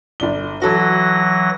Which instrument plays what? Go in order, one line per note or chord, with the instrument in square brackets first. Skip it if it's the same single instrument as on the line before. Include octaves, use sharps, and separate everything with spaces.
[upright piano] G1 D5 G7
[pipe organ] E3 F#3 A#6 [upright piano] F#4 A4